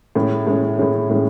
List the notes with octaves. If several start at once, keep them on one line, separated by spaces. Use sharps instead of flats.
A2 G#3 C#4
A2 G#3 C#4
A2 G#3 C#4
A2 G#3 C#4